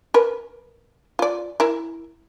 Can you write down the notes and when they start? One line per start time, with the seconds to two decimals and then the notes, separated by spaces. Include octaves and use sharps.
0.14 A#4 B4
1.19 F4 D5
1.60 E4 A#4